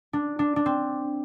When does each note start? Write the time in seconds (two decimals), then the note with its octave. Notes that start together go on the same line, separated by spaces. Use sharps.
0.13 D4
0.39 D4
0.56 D4
0.66 C4